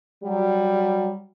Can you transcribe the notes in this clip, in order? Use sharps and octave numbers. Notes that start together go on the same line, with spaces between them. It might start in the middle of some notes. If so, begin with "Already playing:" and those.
F#3 G3